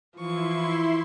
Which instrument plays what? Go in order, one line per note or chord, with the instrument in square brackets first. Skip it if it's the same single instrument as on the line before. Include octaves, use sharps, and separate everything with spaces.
[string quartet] E3 F3 C#6 [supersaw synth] E4 C6